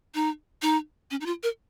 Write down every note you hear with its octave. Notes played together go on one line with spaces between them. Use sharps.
D#4
D#4
C#4
D#4
F4
A#4